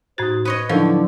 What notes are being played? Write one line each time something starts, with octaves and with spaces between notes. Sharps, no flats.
A2 D#4 F#4 C5 G#6 A6
B4 C#5 D#5 D#6
D3 F3 F#3 D#4 E4 A4 A#4